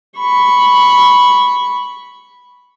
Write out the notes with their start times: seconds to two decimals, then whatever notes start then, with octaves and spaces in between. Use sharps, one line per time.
0.19 B5 C#6